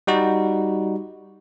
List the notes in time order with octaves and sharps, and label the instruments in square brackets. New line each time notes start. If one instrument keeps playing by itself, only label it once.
[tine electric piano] G3 D#4 F#4